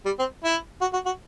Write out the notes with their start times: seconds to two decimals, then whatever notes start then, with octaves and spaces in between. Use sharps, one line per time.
0.06 G3
0.19 C4
0.44 E4
0.81 F#4
0.93 F#4
1.06 F#4